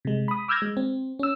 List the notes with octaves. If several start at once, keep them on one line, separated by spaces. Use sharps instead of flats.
C3 G#3
B5 D#6
D6 E6 F6 G6 G#6 A#6
G#3
C4
C#4 E6